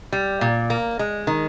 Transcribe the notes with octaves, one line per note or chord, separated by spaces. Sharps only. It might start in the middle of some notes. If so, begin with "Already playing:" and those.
G3
A#2
A#3
G#3
D#3